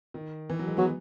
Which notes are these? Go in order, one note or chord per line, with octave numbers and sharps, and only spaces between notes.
D#3
E3
F#3
G#3
F#3 B3